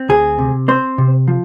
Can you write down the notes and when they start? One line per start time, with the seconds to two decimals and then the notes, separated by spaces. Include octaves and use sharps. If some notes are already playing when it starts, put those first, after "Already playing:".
Already playing: C4
0.09 D2 G#4
0.38 C3
0.68 C4 C5
0.98 C3
1.28 F3